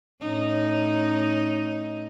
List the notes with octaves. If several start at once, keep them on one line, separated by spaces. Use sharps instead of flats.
A2 C#4 D#4